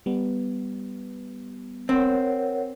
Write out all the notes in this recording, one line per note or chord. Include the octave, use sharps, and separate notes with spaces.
G3 B3
C4 A#4 C#5 F#5